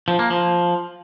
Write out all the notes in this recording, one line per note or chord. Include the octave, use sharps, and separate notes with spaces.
F3
A#3
F3